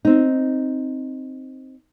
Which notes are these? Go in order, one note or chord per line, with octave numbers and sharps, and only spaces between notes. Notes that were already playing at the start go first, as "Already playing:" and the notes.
C4 D#4